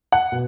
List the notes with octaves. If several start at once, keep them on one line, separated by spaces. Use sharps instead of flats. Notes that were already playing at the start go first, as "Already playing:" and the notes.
F#5
B2